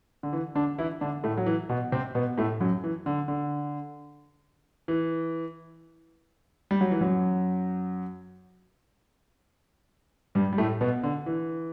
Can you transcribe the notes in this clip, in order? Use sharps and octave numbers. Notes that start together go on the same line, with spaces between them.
D3
E3
D3 D4
E3 E4
D3 D4
A2 A3
F#3
E3
B2 B3
C3 C4
B2 B3
A2 A3
F#2 F#3
E3
D3
D3
E3
G3
F#3
E3
F#2 F#3
G2 G3
G3
A2 A3
B2 B3
D3
E3